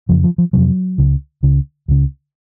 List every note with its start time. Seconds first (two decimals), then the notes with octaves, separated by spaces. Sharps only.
0.09 F2 C#3 F3
0.24 F3
0.38 F3
0.53 F2 C3 F#3
0.98 C#2 C#3
1.43 C#2 C#3
1.88 C#2 C#3